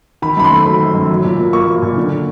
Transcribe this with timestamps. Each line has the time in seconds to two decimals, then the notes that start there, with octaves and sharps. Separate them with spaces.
0.22 D#3 B5
0.37 F#2 B5
0.44 C6
0.51 A3
0.66 F#3 B5
0.80 D#3
0.95 F#2
1.10 F#3
1.24 A#2
1.39 A#2
1.53 A#3 C#6
1.68 F#3
1.82 A#2
1.97 D3